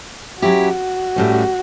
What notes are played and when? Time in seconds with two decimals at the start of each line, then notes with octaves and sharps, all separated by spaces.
0.42 F#3 C#4 E4 F#4 G4
1.16 A2 G3 C#4